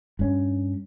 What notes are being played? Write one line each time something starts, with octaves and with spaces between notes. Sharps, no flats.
G2 C#4